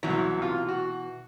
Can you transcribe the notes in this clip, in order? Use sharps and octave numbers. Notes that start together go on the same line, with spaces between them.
C2 B2 E3 F#3
C3 F4
F#4